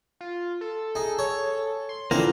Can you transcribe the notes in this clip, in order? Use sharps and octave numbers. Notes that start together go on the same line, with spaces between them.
F4
A4
D#4 G#4
C#5
C6
A#2 D3 E3 F3 A#3 C4 F5